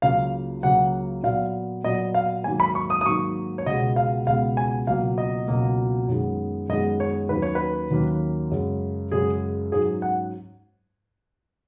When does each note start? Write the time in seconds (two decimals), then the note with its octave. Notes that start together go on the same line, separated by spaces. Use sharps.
0.02 C#2 C#3 F#3 A#3 F5
0.63 C#2 C#3 F#3 A#3 F#5
1.23 A#2 F#3 B3 F5
1.84 A#2 F#3 B3 D#5
2.14 F5
2.44 G#2 D#3 F#3 A#3 G#5
2.60 B5
2.75 C#6
2.90 D#6
3.01 D#6
3.06 G#2 D#3 F#3 A#3 C#6
3.58 C#5
3.66 C#2 B2 G#3 B3 D#5
3.96 F5
4.27 C#2 B2 G#3 B3 F5
4.57 G#5
4.87 C#2 B2 F#3 A#3 F5
5.18 D#5
5.48 C#2 B2 F#3 A#3
6.08 F#2 D#3 G#3 B3
6.69 F#2 D#3 G#3 B3 D#5
7.00 C#5
7.29 D#2 D#3 F#3 A#3 C#4 B4
7.42 C#5
7.55 B4
7.91 D#2 D#3 F#3 A#3 C#4
8.52 F#2 C#3 G#3
9.11 F#2 C#3 G#3 G#4
9.72 G#2 F#3 C#4 G#4
10.02 F#5